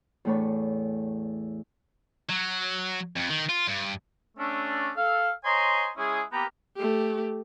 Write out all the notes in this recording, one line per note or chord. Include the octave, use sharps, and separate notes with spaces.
E2 A2 A3 D4 C#5 B5
F#3
F2
D#3
F4
G2
A3 C#4 D4
A4 F5
C5 C#5 D#5 G#5 A#5 C6
G#3 C#4 E4 G#4
A#3 B3 G4 B4 G5 A#5
A3 G4